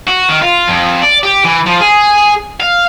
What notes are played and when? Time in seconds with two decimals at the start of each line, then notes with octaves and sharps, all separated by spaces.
0.07 F#4
0.29 D#3
0.42 F4
0.68 F2
1.02 D5
1.24 G4
1.45 E3
1.67 F3
1.81 G#4
2.60 F5